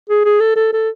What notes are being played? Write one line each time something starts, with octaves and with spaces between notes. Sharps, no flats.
G#4
G#4
A4
A4
A4